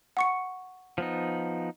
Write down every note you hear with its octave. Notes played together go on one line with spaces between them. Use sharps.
F#5 C#6 C#7
F3 B3 D#4